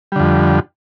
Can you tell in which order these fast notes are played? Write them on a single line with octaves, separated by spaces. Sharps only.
G3 D3 F2